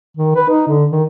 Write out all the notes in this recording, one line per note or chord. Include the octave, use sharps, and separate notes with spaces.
D#3
B4
D#4
D3
D#3